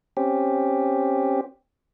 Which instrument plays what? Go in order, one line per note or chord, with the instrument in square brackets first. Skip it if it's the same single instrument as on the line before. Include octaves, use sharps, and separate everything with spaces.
[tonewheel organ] C4 C#4 G4